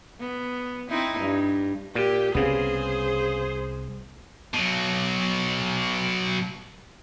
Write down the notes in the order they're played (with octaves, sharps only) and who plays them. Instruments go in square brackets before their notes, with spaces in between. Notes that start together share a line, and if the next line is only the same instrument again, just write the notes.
[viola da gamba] B3
C4 D#4 E4
G2
[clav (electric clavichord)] A#2 [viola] G4
[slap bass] C2 C4 [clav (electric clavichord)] C#3 B3 [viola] G#4 C5
[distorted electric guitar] B2 F#3